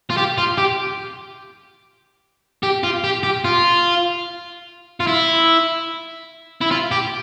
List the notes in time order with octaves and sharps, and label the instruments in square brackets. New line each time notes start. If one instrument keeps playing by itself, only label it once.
[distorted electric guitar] F4
G4
F4
G4
G4
F4
G4
G4
F4
F4
E4
E4
F4
G4